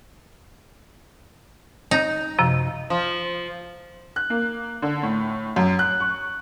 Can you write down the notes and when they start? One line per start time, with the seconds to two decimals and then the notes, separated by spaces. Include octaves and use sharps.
1.91 D#4
2.39 F#2 C3 F3
2.90 F3
4.16 F#6
4.30 A#3
4.82 D3
5.03 A2
5.56 F#2
5.79 F#6
6.00 C#6